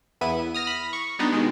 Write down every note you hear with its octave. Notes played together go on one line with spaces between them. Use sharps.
E2 B3 E4 D#7
D#6 F6 A#6
B5
C#6
G3 B3 D4 D#4
B2 D#3 G#3